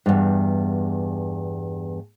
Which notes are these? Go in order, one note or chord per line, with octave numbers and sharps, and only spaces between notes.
E2 G2